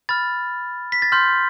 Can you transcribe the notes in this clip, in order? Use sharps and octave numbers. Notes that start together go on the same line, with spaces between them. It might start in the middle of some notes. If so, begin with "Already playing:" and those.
B5 F6 A6
B6
A6
C6 F6 G6